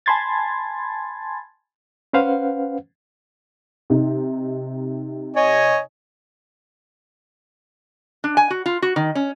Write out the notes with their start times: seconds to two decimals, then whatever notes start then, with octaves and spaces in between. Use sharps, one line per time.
0.06 G#5 A5 B5 C6 G#6 A6
2.13 C#4 B4 C5 F5 F#5
3.90 C3 D#4
5.36 C#5 D#5 G#5
8.24 D4
8.37 G#5
8.50 F#4
8.66 F4
8.82 F#4
8.96 D#3
9.15 C#4